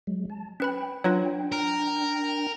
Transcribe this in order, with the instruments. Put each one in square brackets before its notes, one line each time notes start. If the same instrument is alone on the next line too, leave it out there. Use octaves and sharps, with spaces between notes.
[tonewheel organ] F#3 G#3
A5
[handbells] C#4 B4 B5 [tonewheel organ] G5
[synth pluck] F#3 [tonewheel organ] D4 G5 [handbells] F4 B4 C#5
[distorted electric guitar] A#4